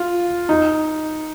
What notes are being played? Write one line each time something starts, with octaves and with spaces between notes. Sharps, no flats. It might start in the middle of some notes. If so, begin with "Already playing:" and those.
Already playing: F4
D#4